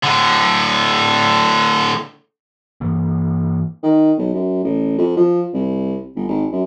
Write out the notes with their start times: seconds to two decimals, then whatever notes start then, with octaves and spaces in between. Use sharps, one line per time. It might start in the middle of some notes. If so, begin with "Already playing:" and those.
0.03 A2 D3
2.81 G2 E3 A#3
3.83 D#3
4.18 B1
4.34 F#2
4.63 A1
4.98 F2
5.17 F3
5.54 C2
6.16 G1
6.28 G#1
6.52 F#2